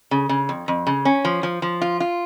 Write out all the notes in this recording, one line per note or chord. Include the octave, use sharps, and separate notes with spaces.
C#3
C#3
F2
F2
C#3
C#4
F3
F3
F3
F4
F4